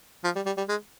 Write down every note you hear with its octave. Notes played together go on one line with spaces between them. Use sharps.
F3
G3
G3
G3
G#3